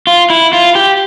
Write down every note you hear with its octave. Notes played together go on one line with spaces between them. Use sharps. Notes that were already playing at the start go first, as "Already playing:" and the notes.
F4
E4
F4
G4